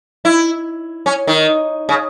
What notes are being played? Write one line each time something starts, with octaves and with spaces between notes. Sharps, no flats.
E4
C#4
D#3
C#3